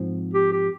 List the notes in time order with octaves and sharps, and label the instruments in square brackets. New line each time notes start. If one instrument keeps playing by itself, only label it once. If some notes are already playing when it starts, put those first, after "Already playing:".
Already playing: [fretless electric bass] G#2 F3 C4
[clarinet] G4
G4